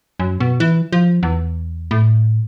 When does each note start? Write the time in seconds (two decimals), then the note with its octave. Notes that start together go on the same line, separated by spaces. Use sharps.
0.20 F#2
0.40 B2
0.60 E3
0.93 F3
1.23 E2
1.91 A2